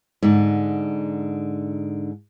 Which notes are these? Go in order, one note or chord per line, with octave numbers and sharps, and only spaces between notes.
G#2 D3